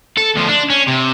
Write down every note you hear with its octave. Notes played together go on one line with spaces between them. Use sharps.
A4
D2 F3
D4
C#4
C3